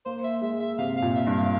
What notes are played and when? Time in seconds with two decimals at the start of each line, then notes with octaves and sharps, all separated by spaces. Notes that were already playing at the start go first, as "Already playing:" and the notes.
0.06 A#3 C5
0.24 E5
0.42 G#3 E5
0.60 E5
0.79 C3 F5
0.97 F5
1.02 A#2
1.15 E5
1.27 G2
1.33 F5